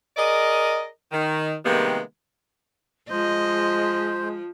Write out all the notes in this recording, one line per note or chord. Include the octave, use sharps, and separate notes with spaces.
G#4 A#4 D5 D#5
D#3
C3 D#3 G3 G#3 A#3 B3
F3 G#3 C5 D#5